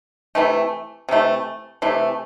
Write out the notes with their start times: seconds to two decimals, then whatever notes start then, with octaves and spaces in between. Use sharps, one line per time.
0.35 C3 E3 A3
1.09 C3 E3 A3
1.82 C3 E3 A3